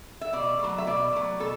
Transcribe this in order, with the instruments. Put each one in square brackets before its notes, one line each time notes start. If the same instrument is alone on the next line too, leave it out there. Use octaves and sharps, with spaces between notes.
[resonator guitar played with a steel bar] E5
B2 D5
F#3 A3
E5
B2 D5
F#3 A3
B2 A4